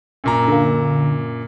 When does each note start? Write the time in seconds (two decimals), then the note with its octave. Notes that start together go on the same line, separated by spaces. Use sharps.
0.24 F#2 A#2 A#5
0.48 D3 A#3